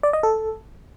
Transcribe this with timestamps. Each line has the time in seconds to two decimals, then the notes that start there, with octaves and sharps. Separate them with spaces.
0.03 D5
0.13 D#5
0.23 A4